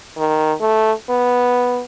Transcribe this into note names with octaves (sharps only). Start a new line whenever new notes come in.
D#3
A3
B3